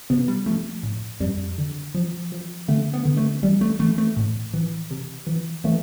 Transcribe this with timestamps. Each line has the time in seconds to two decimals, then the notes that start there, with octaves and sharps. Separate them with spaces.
0.10 C3 B3
0.28 G3
0.46 F3 A3
0.83 A2
1.20 F2 G3
1.58 D3
1.95 F3
2.32 F3
2.68 D3 A3
2.93 B3
3.05 D3
3.17 A3
3.42 E3 G3
3.61 A3
3.79 E3 A3
3.98 A3
4.17 A2
4.54 E3
4.91 C3
5.27 E3
5.64 E3 A3